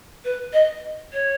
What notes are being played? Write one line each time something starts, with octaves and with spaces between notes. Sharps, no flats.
B4
D#5
C#5